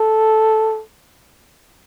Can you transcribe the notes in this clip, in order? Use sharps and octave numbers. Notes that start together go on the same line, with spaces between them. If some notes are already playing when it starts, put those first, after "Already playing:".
Already playing: A4